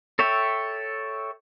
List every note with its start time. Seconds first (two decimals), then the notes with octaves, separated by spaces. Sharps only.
0.19 A4 C#5 E5 G5